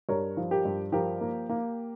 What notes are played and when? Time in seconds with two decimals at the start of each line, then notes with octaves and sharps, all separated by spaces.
0.09 G2 A#4 C#5
0.37 F3
0.51 G4 A#4
0.65 G2
0.92 F3 G4 A#4
1.21 A#3
1.49 A#3